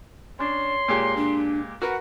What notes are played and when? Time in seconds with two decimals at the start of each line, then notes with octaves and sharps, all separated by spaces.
0.39 C#4 D4 C#5 C6
0.88 A#2 G#3 G4
1.16 D4
1.82 F#4 A#4 B4 F#5